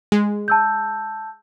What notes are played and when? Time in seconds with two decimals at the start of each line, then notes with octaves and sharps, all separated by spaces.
0.12 G#3
0.48 A5 E6 G6